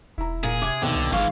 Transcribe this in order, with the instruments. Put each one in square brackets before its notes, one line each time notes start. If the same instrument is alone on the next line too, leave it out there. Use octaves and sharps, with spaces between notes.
[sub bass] E1 [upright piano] E4 A#5
[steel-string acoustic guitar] A#2 [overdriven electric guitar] G#4
[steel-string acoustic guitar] C3 [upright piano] D6 G#6
[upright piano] D#2 B2 [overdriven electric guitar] D3
[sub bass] C2
[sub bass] G1 [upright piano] G#2 C#6 [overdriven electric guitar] E3 F4 [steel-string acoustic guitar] F5